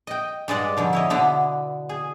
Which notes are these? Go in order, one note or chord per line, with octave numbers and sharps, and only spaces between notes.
D#5 G5
G2 G#3 D5 D#5 F#5
F2 D3 F3
E4 C#5 D#5
B2 D3 B3
G#4